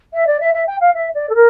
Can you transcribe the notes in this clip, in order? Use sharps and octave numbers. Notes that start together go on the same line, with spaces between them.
E5
D5
E5
E5
G5
F5
E5
D5
A4
A#4